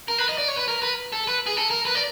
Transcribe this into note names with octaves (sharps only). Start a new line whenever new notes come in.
A#4
B4
D#5
D5
C#5
B4
A#4
B4
A4
B4
G#4
A4
A#4
B4
D5